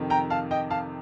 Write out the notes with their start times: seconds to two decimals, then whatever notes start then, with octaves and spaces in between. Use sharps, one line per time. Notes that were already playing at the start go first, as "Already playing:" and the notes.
Already playing: F2 C3 D#3
0.10 G5 A#5
0.30 F5 A5
0.51 D#5 G5
0.70 F5 A5